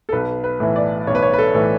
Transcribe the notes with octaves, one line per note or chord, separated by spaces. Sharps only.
A4
B1 B4
B4
A2 E3
D5
B1 C#5
B4
C#5
B4
A4
A2 E3